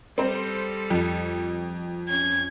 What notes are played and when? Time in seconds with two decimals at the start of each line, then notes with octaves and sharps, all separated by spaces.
0.18 G3 C4 A4 C5
0.90 F2
2.09 C#4 G#6